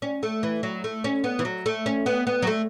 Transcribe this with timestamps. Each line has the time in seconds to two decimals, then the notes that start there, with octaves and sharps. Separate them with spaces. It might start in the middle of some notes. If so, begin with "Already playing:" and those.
0.02 C#4
0.23 A3
0.43 E3
0.63 F#3
0.84 A3
1.04 C#4
1.24 B3
1.39 E3
1.45 F#3
1.66 A3
1.86 C#4
2.06 B3
2.27 B3
2.42 F#3
2.47 A3